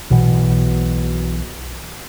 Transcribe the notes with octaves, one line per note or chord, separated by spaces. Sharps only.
B1 B2 E3